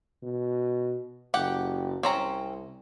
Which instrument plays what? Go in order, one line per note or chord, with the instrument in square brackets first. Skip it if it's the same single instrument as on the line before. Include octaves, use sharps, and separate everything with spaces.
[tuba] B2
[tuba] F#1 [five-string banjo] G4 F#5
[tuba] C2 [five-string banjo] C4 C#4 A#5